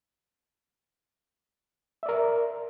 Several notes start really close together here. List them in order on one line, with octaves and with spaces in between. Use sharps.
E5 D5 A#4